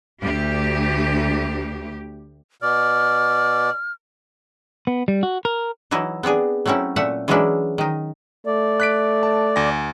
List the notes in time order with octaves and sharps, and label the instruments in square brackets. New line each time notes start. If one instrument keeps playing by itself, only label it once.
[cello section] D2 G4
[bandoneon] B2 D5 [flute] F6
[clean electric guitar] B3
G3
F#4
A#4
[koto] E3 F#3 D#4 E4
B3 C4 D4 G#4
F#3 A3 C4 C#4 E4
A#2 A3 E5 F#5
E3 F#3 G#3 C#4 D4 E4
D#3 D#4
[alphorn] A3 [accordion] D5
[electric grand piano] F#6 B6 D7
A5
D2 G#5 A#6